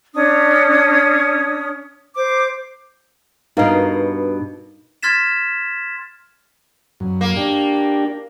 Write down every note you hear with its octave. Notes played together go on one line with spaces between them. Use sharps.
C#4 D4 D#6
C5 D6
G2 B2 D#4 A#4 F5
C6 F6 G#6 A6 B6 E7
F#2
A#3
D4 G4